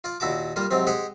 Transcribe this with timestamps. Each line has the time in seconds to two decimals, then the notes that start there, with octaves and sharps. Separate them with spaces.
0.04 F4 D5
0.20 D#2 A#2 E4 F#4 A5 D6
0.56 G3 A#3 F4
0.71 G#2 C3 F#3 C4
0.87 G#3 G4 G#4 F#5